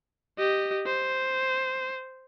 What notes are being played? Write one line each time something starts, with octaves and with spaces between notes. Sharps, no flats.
G4 D#5
C5